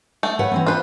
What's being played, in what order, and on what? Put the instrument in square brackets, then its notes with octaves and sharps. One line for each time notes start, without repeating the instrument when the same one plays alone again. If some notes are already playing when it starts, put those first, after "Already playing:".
[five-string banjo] A3
[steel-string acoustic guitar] B4 C#5 F#5
E3 C4 C#4
[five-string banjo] F4 B4 [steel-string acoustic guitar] C5